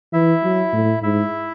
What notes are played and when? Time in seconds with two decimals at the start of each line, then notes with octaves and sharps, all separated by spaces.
0.13 E3 E4 E5
0.43 F#3
0.73 A2
1.02 G#2 E4 E5